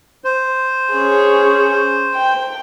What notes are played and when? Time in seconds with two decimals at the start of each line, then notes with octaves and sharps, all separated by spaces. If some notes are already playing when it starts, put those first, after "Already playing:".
0.24 C5
0.93 C#4 G#4
2.15 G5